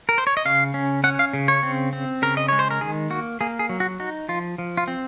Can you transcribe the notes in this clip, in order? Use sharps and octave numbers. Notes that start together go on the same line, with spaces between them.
A#4
C5
C#5
D#5
C#3 F5
C#4
C#4 F#5
F5
C#3
C#5
C4
C4
C#3 A#4
D#5
G#3 C#5
C5
A#4
D#3 G#4
A#3 F#4
A#3 G#4
G#4
F#3
F#4
D#4 F#4
F3 F4
F3
F4
C4